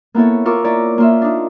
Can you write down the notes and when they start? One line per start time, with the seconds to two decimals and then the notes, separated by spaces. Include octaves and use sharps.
0.14 A#3 B3 E4 A4 C#5
0.45 F4 A#4 C#6 D6 E6
0.64 E4 C#5 D5 A#5
0.98 A#3 F4 E5
1.22 D4 D#4